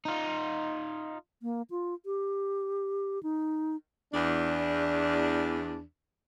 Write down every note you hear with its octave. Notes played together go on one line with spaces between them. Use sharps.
D#4 F4
A#3
F4
G4
D#4
E2 D4